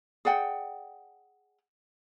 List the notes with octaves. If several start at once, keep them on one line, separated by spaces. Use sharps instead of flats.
G#4 D5 F#5 G5